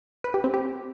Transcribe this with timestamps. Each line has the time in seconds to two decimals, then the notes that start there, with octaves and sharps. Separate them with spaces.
0.24 B4
0.34 G4
0.44 C4
0.54 G4